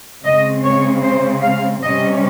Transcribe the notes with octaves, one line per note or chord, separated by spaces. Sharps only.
C#3 G#3 C4 D#5
C#5
C5
F5
C3 G3 C#4 D#5